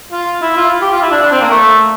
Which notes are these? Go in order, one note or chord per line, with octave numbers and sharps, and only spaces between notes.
F4
E4
F4
G4
F4
E4
D4
D4
C4
A#3
A3